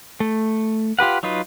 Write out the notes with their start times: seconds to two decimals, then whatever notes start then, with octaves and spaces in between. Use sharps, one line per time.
0.20 A3
0.99 F4 G4 B4 F#5
1.23 F#3 D#4 F4 B4